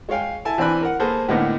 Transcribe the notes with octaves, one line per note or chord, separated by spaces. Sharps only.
G#3 C#5 F5 G5 G#5
E4 A4 G#5 A5
E3 C4 D4 G#5 B5 F#6
A#4 F#5
A#3 G#4 A4 B4 C5
A2 D3 G#3 A#3 B3 D#4